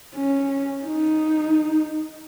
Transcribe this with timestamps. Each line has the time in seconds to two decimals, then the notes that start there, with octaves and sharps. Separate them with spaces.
0.16 C#4
0.86 D#4